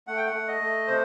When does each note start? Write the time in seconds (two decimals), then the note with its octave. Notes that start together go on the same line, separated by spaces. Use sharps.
0.07 A3 F#5
0.17 G5
0.26 F#5
0.33 A3
0.48 D#5
0.61 A3
0.87 C3 C5